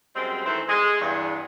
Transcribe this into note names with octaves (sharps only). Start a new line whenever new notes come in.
F#2 G3 G#3 C4
D#3 E3 A3 C4 A4 C5
G#3
E2 G2